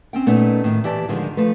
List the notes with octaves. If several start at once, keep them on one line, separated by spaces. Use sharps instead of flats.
C4 C#4 G5
A#2 A3 B3 C#4 D#4
A2 D#3
E3 G4 D5 A5
G#2 D3 D#3 F3 G#3
F3 A3 B4